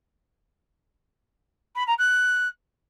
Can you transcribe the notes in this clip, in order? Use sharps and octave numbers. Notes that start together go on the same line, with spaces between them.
B5
A#5
F#6